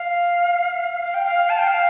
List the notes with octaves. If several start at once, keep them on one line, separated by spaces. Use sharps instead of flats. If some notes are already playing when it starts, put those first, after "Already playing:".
Already playing: F5
F5
G5
F5
A5
G5
F5